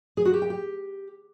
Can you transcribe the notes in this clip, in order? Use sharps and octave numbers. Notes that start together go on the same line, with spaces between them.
G#4
F#4
G4
G5
G4